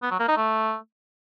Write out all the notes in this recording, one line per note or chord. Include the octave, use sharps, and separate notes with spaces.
B3
F#3
A#3
D#4
A3